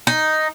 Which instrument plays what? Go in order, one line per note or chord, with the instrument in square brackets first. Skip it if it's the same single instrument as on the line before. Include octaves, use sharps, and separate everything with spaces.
[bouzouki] D#4